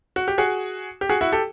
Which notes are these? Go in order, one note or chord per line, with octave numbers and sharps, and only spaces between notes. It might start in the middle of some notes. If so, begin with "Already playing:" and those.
F#4
G4
F#4 G#4
G4
F#4 G#4
E4 F#4
G4 A4